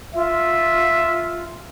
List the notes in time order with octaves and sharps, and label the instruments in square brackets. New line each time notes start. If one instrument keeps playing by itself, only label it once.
[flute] F4 [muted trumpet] E5